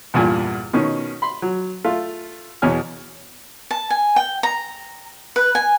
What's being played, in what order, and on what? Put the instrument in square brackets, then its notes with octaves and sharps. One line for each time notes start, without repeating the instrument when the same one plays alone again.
[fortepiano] E2 G2 A#2 G#5
B2 D#3 C#4
B5 C6
F#3
A3 F4
E2 B2 C#5 G#5 F6
[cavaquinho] A5
G#5
G5
A#5
B4
G#5